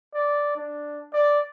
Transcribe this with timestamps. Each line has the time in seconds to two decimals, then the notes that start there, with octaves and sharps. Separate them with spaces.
0.14 D5
0.56 D4
1.14 D5